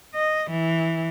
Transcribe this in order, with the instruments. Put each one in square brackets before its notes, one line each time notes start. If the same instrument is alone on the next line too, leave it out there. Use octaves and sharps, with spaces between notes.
[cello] D#5
E3